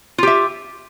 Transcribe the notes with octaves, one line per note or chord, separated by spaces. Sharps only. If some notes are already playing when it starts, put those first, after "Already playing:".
F4 G4 E5